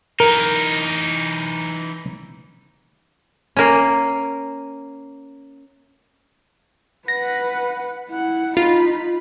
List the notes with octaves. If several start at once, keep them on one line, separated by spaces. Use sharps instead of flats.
E3 D#4 A#4
A#3 C#4
B4 F#5 A#6
E4 F#5
D#4 F4 B5